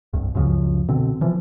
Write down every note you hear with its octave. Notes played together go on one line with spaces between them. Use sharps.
C2 G2
C#2 F#2 C#3 F3
B2 D3 C4
E3 F3